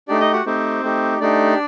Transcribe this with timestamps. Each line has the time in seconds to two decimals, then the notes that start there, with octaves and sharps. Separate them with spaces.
0.08 A3 D4 D#4 G4 D5
0.20 D#4 D#5
0.33 F#4 F#5
0.45 A3 C4 D#4 G4 C5
0.83 A3 D#4 G4
1.20 A3 D4 D#4 G4 D5